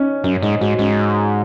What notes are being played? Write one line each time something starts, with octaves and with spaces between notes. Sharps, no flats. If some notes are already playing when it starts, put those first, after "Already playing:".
Already playing: C#4 D#4
F#2 C#4
G#2 D#4
G#2 F#4
G#2 C#4